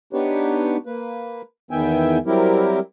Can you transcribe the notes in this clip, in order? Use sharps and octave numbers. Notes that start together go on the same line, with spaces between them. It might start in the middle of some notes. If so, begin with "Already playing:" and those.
B3 D4 D#4 G4 B4 C#5
A#3 B4
E2 D#3 B3 E5 G5 G#5
F#3 G3 C4 E4 G4 A#4